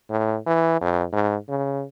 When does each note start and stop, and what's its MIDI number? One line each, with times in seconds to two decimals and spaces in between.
0.10 0.37 45
0.47 0.78 52
0.81 1.05 41
1.13 1.36 44
1.49 1.83 49